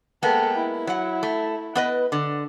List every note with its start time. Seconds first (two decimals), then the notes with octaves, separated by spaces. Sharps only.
0.23 G#3 A#3 B3 A4 G5
0.59 E4
0.87 F#3 F#5
1.23 A3
1.75 B3 B4 D#5
2.12 D3